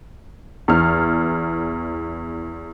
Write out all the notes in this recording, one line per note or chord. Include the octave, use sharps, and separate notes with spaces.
E2 F6